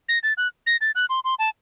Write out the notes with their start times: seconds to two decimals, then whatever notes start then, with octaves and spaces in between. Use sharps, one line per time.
0.09 A#6
0.23 A6
0.38 F#6
0.67 A#6
0.81 A6
0.95 F#6
1.10 C6
1.24 C6
1.39 A5